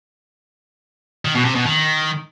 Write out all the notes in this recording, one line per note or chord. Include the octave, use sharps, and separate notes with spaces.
D#3
B2
C3
B2
D#3